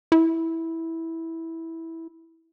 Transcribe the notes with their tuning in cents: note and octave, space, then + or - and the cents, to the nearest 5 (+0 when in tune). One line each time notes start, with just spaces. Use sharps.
E4 -10